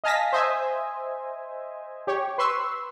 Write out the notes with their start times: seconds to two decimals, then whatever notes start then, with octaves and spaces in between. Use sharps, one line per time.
0.04 D#5 F5 G#5 A5 A#6 B6
0.33 C5 D#5 E5 G#5
2.07 G4 C#5
2.38 B4 C6 C#6 E6